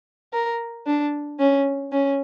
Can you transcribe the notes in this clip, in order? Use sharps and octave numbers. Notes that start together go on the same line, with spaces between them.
A#4
D4
C#4
C#4